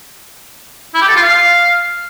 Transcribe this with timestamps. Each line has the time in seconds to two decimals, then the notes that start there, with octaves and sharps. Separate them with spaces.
0.94 E4
1.01 G4
1.09 A4
1.16 F4
1.23 F5